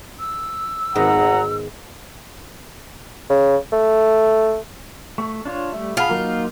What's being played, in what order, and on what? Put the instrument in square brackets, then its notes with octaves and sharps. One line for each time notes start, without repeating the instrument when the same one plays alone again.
[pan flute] E6
[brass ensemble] G#1 F#5 A#5 [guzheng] G#2 D#3 B3
[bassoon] C#3
A3
[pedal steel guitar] A3 [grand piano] C#6
[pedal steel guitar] D4 F4 C#5
[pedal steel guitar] G3 A3 [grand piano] E5
[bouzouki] F4 [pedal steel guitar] G#4 F5 [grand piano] F#5 A5 B5
[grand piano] F#3 A#4 [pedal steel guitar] A#3 D#4